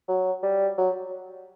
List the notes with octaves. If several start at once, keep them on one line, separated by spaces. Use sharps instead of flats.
F#3
G3
F#3